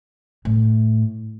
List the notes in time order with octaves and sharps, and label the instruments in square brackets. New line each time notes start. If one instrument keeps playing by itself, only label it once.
[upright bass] A2